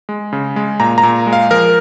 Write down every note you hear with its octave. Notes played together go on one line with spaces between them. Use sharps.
G#3
C#3
G#3
A#2 A#5
A#5
A#2
G#3
F5
F3 A#4